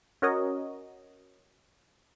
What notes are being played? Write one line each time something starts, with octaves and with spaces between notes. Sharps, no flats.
C#4 F#4 A#4 C#5 D#5